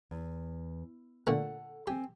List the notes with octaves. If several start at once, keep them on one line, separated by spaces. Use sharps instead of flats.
E2
A#2 D3 A3 A4 F#5
C4 G4 G#5